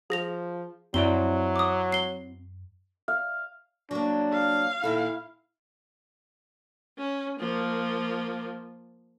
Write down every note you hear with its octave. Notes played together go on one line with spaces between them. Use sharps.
F3 G#4 A#6 F7
F#2 F#3 C4 E4 D5 G7
D6 D#6
C7 G7
F5
F#3 A#3 D4
F5
A#2 D#3 E4 A4
C#4
F3 A#3